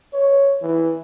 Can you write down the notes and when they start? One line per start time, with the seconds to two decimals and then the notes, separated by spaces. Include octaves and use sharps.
0.14 C#5
0.62 E3